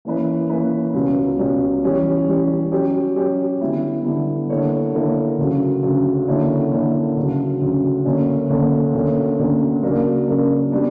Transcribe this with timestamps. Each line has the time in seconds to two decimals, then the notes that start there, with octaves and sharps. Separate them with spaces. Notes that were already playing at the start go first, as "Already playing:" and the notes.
0.05 E3 A#3 C#4 E4 B4
0.50 E3 A#3 C#4 E4 B4
0.94 C#2 B2 G3 C#4
1.39 C#2 B2 G3 C#4
1.83 E3 G3 C#4 G4 C#5
2.28 E3 G3 C#4 G4 C#5
2.71 F#3 C#4 G4
3.16 F#3 C#4 G4
3.61 D3 G3 B3 E4
4.05 D3 G3 B3 E4
4.50 D3 A#3 E4 A#4 C#5
4.94 D3 A#3 E4 A#4 C#5
5.38 D2 C#3 F#3
5.83 D2 C#3 F#3
6.28 D3 A#3 C#4 E4
6.72 D3 A#3 C#4 E4
7.17 D2 C#3 F#3
7.61 D2 C#3 F#3
8.05 D2 D3 A#3 C#4
8.49 D2 D3 A#3 C#4
8.94 D2 D3 A#3 C#4
9.39 D2 D3 A#3 C#4
9.83 C#3 F#3 A#3 D4 A#4
10.28 C#3 F#3 A#3 D4 A#4
10.72 G3 B3 D4